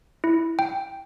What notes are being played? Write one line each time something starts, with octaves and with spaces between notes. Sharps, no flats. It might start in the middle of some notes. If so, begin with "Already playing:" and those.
E4
G5